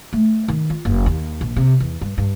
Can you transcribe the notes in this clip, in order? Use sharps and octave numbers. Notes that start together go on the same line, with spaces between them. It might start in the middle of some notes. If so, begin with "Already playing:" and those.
A3
D#3
F4
F#1
D#2
A#1
C3
E2
G2
G2